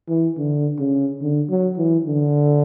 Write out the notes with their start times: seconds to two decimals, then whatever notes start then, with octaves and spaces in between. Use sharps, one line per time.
0.09 E3
0.37 D3
0.79 C#3
1.22 D3
1.50 F#3
1.77 E3
2.06 D3